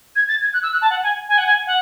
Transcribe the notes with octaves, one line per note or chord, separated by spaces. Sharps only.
G#6
A6
G#6
F#6
E6
F#6
A5
F#5
G#5
G#5
F#5
G#5
F#5